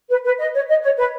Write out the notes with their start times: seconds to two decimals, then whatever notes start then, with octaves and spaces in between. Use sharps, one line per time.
0.09 B4
0.24 B4
0.38 D#5
0.54 C#5
0.68 D#5
0.82 C#5
0.97 B4